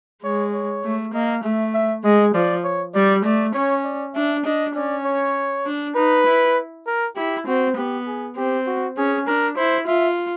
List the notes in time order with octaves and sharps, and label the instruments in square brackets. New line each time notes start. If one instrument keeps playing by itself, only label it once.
[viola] G#3 [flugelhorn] C#5
[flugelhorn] C#5
[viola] A3
[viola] A#3 [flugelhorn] D#5
[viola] A3 [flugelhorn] E5
[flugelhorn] E5
[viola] G#3 [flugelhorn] D#5
[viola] F3 [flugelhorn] D5
[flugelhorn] C#5
[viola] G3 [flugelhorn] D5
[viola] A3 [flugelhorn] D5
[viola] C#4 [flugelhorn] C#5
[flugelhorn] D5
[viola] D4 [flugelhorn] E5
[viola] D4 [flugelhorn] D#5
[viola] C#4 [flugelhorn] D5
[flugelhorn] C#5
[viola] D4
[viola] D#4 [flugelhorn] B4
[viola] E4
[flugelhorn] A#4
[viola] E4 [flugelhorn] G4
[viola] C4 [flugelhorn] F#4
[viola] B3 [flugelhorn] G4
[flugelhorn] G#4
[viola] C4 [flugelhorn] G4
[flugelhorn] F#4
[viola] C#4 [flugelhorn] G#4
[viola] D4 [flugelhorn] A#4
[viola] E4 [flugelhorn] C5
[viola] F4 [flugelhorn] E5